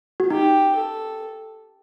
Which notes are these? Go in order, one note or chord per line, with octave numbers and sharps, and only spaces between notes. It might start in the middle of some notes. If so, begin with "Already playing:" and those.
F#4
D#4 G4
A4